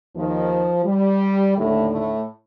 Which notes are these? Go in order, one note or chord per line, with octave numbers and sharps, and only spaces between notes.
D#2 D#3 F3
G3
D#2 A2 D3 A3
A2 A3